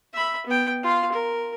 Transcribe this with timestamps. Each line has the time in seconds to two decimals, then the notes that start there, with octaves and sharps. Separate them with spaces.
0.13 E5 B5
0.47 B3 G5
0.83 F4 F5
1.12 A#4